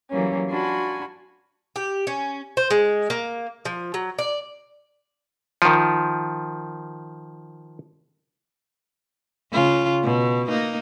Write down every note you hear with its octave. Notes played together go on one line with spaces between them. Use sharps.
E3 F#3 G3 A#3 C#4
D4 F4 F#4 G#5 A5 B5
G4
C#4
C5
G#3
A#3
F3
F#3
D5
D#3 F3
C#3 F4
B2
A#3 D#4